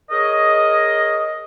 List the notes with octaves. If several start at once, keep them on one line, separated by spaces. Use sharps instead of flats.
G#4 A#4 C#5 D#5